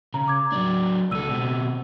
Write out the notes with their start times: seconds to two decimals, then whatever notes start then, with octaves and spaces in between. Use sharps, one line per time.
0.14 C#3 A#5
0.28 D6 G#6
0.52 F#3 D4
1.11 C#2 A4 E6 D#7
1.29 B2 C4